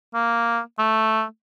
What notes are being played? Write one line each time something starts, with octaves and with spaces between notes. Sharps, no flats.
A#3
A3